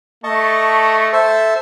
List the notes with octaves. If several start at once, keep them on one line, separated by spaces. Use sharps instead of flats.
A3 D#5 A5 C#6
A4 C5 E5